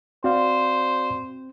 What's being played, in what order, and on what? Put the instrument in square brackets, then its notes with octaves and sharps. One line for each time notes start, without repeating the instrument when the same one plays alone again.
[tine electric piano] C4 [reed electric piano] F#4 D5 F5 [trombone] C5